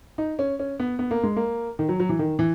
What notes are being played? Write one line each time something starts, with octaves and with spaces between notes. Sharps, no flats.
D#4
C#4
C#4
B3
B3
A#3
G#3
A#3
D#3
F#3
F#3
E3
D#3
E3